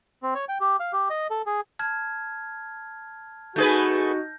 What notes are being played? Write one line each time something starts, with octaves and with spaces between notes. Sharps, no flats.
C4
C#5
G5
G4
F5
G4
D#5
A4
G#4
A5 F6 G#6
A3 D#4 F#4 G#4 B4 G6 A#6